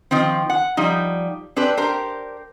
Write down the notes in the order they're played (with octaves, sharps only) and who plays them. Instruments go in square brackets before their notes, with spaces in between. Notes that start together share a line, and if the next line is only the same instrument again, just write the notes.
[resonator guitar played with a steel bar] D#3 F3 C4
F#5
F3 G3 D#4
C4 D4 G4 B4
G4 A#4 C5